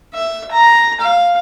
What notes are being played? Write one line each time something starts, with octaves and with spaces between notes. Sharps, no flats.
E5
A#5
F5